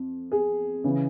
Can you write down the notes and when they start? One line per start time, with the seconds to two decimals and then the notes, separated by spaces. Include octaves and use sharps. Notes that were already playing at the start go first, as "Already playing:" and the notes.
Already playing: F2
0.32 G#4
0.84 C#3 E3